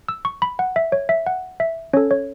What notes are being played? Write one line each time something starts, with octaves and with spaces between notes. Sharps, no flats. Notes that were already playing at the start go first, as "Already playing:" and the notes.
E6
C#6
B5
F#5
E5
C#5
E5
F#5
E5
C#4 A4 C#5
C#5